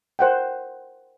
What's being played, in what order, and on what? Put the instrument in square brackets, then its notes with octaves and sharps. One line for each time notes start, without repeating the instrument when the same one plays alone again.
[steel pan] A#4 C5 F#5 G5